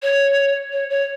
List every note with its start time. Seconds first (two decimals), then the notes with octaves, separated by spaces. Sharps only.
0.02 C#5
0.72 C#5
0.90 C#5